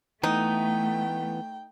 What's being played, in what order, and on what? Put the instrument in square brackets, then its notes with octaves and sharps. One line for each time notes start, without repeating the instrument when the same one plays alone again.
[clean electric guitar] E3 B3 [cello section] A3 [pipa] D#4 [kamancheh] G5